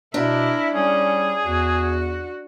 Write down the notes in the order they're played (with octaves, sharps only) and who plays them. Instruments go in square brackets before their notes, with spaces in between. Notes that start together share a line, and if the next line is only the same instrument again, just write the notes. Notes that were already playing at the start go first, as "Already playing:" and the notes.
[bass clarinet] B2 [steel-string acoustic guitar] D4 [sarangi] E4 [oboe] A#4
[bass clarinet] G3 [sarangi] C#4 [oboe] G#4
[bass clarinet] E2 [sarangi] F#4